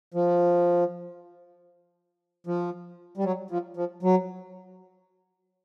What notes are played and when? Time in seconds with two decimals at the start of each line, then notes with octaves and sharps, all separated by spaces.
0.14 F3
2.47 F3
3.17 G3
3.24 F#3
3.50 F3
3.77 F3
4.03 F#3